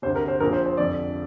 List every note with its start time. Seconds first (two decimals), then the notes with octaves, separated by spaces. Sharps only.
0.02 D2 C3 C5
0.16 A#4
0.28 C5
0.40 A#1 A#2 A#4
0.53 C5
0.66 C5
0.77 F1 F2 D3 D5